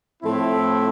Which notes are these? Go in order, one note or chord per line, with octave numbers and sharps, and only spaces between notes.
A2 F3 A3 C4 E4